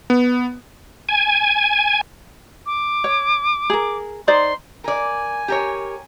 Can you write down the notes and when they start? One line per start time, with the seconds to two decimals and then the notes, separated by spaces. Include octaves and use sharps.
0.10 B3
1.09 G#5
2.66 D6
3.04 C#5
3.70 G#4 A#4
4.27 D#4 C5 D5 C6
4.84 A#4 D5 G#5
5.48 G4 A#4 C#5